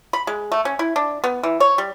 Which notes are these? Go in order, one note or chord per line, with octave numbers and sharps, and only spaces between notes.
B5
G#3
A3
C#4
E4
D4
B3
E3
C#5
G3